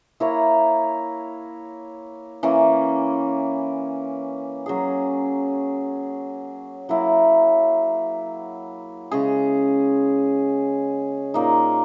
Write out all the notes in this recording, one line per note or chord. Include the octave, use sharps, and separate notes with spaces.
A#3 E4 A#4 C#5
E3 A#3 C#4
F#3 C#4 G#4
F#3 A#3 E4
C#3 G#3 C#4 G#4
A#2 A#3 D#4